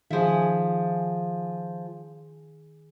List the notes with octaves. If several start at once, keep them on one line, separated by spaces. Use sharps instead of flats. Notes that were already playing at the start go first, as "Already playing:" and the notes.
D#3 F3 G#4 E5